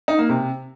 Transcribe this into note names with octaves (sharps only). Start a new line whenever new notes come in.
D#4
A#3
C3